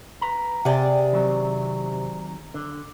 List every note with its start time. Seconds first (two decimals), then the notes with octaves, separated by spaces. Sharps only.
0.21 B4 A#5
0.65 C3 G#4 D5 F#5 G5
1.13 D#3 F#3 C4
2.54 D3